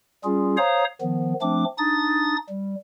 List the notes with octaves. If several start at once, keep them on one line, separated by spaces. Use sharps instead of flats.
G3 C#4 F4 G#4
C5 C#5 F5 A#5 D#6
D#3 F3 B3
F3 A3 C4 D4 D6
D4 D#4 D#6 A6
G3